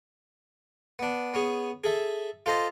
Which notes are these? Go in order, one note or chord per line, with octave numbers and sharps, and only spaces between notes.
B3 D4
B3 C#4 G#4
G#4 A4 E5
F4 A4 C5 D#5